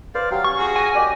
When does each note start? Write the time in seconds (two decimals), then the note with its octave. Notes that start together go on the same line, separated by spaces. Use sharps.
0.15 B4 C5 D5 F5
0.31 F#3 G4 F5 G5
0.44 C#4 C#6
0.58 F#4 G#4
0.76 F#5 G#5 A#6
0.95 G4 D5 D#5